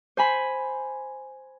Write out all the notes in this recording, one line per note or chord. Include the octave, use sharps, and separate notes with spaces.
C5 G#5 B5